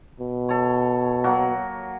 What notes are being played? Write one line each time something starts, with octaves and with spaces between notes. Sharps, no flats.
B2
A4 C#5
F#3 A#3 F#4